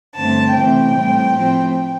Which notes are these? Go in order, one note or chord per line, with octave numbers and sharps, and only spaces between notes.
G2 D3 A3 C4 A5
C3 E3 A3 C4 G5
A2 G3 C4
A2 F3 A3 C4